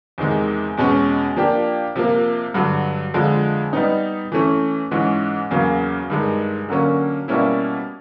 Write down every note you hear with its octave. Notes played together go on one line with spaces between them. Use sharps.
E2 C3 D#3 G#3
E2 B2 G#3 C#4
F3 A#3 D4 G4
C3 F3 A#3
G2 D3 F#3
F2 D3 F3 G#3
G3 B3 D#4
E3 A3 C#4
G#2 E3 G#3 C#4
E2 C#3 F#3 A#3
G2 D#3 G#3
D3 F#3 A#3 C#4
B2 G3 A#3 C#4 E4